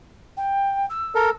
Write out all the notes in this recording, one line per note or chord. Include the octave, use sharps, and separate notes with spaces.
G5
E6
A4 A#4